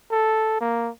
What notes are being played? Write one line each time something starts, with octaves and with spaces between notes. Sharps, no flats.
A4
A#3